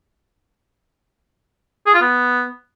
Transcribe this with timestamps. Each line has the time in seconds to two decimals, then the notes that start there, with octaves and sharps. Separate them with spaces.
1.87 G#4
1.94 F4
2.01 B3